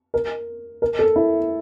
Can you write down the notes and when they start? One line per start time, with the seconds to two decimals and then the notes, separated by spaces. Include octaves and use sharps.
0.14 A#4
0.82 A#4
0.99 A4
1.16 E4